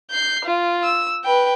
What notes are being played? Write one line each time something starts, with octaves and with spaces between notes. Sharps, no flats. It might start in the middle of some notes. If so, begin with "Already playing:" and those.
G6 C7
F4
E6
B4 G5